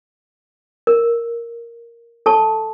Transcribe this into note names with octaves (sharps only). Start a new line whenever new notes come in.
A#4
A4 A5 C#6